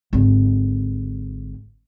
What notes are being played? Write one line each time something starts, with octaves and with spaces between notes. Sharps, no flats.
G#1 D3